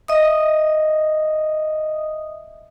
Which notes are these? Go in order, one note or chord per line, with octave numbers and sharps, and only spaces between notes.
D#5 E5 D#6